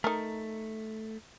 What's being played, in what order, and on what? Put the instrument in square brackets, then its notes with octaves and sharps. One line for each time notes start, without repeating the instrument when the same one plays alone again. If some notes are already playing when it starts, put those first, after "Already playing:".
[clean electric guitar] A3 [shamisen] D#4 A#4